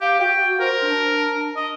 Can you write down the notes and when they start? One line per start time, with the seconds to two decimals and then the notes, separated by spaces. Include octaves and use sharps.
0.02 G4 F5
0.20 F#4 G5
0.61 A#4 C5
0.82 D4
1.57 D#5